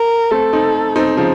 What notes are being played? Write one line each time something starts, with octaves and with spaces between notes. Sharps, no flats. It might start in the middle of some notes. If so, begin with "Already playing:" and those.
Already playing: A#4
A3 C4 A4
C4 D#4
C4 D#4
C#3 F3